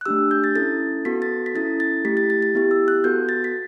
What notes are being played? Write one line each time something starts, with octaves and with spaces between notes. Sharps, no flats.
F#6
A3 D4 G4 E6
G6
A6
C#4 E4 A4 A6
B3 F#4 A4 B6
A6
B6
C#4 E4 A4 A6
A6
A3 E4 G4 B6
A6
A6
A6
B3 E4 G4
E6
F#6
B3 F#4 A4 G6
A6
B6